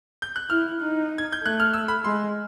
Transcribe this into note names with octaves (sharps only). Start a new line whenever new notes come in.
G6
F#6
E4 F6
D#4
G#6
G6
A3 F#6
F6
E6
B5
G#3 C6